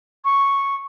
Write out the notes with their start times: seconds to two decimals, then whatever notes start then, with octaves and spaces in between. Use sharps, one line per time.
0.25 C#6